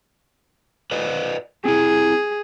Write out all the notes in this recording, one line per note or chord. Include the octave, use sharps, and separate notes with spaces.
B4 D5 D#5
C4 E4 G#4